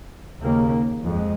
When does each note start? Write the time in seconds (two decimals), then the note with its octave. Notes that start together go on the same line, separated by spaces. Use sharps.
0.42 D#2 C#3 A#3
1.06 F2 G#3